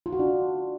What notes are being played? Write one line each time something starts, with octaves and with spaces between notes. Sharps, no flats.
F4
F#4
D4